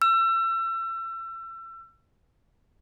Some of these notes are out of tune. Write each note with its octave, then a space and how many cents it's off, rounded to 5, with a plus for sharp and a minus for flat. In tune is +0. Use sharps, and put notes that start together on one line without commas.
E6 +35